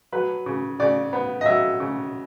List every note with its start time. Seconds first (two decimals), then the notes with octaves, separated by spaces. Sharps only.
0.12 F#3 B4
0.46 C#3
0.80 C#3 D5
1.13 B3
1.41 D#5
1.46 F#3 E5
1.80 C#3